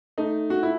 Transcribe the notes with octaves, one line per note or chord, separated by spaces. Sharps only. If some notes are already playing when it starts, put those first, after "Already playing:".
A3 D#4
F#4
E4